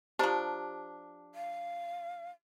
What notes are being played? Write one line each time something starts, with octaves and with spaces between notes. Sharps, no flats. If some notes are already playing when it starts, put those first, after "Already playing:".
F3 D4 G4 C5 A#5
F5